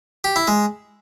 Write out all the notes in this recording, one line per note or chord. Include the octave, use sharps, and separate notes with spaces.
G4
E4
G#3